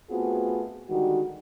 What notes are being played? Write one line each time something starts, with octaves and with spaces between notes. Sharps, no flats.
A3 B3 C4 F4 F#4 G#4
D3 D#3 G3 G#3 F#4